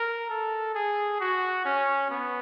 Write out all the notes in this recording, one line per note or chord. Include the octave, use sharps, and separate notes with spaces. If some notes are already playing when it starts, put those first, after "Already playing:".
Already playing: A#4
A4
G#4
F#4
C#4
B3